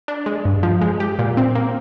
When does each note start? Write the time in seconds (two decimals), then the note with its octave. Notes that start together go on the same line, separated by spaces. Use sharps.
0.08 D4
0.26 G#3
0.45 G2
0.63 F3
0.81 G#3
1.00 G4
1.19 A#2
1.37 C4
1.55 A#3